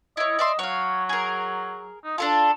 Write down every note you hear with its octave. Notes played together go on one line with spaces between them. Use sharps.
E4 C#5 D#5
D5 E5 C6
F#3 C#5 F5
G#4 A#4
D#4
D4 F4 A4 A5